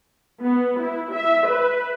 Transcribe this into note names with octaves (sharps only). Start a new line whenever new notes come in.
B3
E4
E5
B4